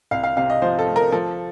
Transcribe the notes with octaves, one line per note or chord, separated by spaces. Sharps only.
C2 F5
F5
C3 F5
D#5
F3 C5
A4
A3
A#4
F3 A4